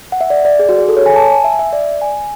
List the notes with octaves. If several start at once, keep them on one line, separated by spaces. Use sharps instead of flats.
F#5
E5
D5
D5
G#4
F#4
G#4
A4
C#5
G#5
A5
G#5
E5
E5
D5
G#5